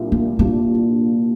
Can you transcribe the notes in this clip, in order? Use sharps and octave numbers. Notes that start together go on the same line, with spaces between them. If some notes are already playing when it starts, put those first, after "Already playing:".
Already playing: C2 A#2 G3 D4 F4
A#3
C2 A#2 G3 A#3 D4 F4